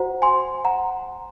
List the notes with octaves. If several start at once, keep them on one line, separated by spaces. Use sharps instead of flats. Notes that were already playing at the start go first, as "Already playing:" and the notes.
Already playing: F#4 C5 F#5 A#5
G#5 C6
F#5 A#5